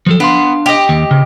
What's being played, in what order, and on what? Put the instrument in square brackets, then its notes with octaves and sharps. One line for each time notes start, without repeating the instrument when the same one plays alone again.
[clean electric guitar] F3 F#3 A4
[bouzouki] B3 [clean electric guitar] D4 F5 C6
[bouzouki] G4 D#5
[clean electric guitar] D#2
C#3